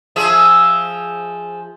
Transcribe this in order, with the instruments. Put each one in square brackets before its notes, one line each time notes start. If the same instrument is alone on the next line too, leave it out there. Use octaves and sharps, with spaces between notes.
[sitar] F3 G#4 E5